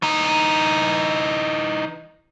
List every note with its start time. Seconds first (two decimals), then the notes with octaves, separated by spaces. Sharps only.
0.02 E3 D#4